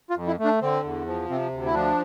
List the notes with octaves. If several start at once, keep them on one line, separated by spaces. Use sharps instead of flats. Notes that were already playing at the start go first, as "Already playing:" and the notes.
F4
F2
E4
A3
D4
D3 C4
E2
F3
C3 C4
D2
E4
F3 D4